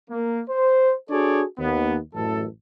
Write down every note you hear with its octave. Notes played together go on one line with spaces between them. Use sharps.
A#3
C5
D4 F#4 G#4 A4 C#5 D5
D#2 B3
A1 F#2 A4